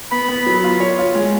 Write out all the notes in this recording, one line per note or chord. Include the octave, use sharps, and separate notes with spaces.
B3 B5
B3
F#3
F4
C#5
F4
G#3